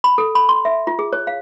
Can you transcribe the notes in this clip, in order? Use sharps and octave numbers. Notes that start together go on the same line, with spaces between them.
B5
A4
B5
C6
E5
F4
G#4
C#5
F5